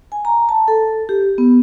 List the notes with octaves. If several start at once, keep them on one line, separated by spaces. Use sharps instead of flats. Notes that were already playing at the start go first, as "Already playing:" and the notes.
G#5
A#5
A5
A4
G4
B3